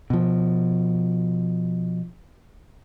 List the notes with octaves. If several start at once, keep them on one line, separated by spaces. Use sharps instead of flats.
B2 F3